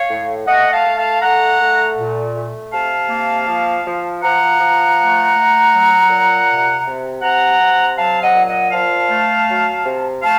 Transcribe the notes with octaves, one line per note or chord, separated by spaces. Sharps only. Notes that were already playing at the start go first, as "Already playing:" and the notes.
Already playing: C#5 F5
A2
A3 D#5 F#5
F5 A5
A3
F5 A5
A3 F#5 A#5
A3
A#2
A3
C3 F5 A5
A#3
F3
F3
F3 F#5 A#5
F3
A3
A3
F#3
A#2
C3
C3
C3 F#5 A#5
C3
F#3 F5 A5
D#5 F#5
A#2
D#5 F#5
F3 F5 A5
A3
F#3
C3
A3 F5 A5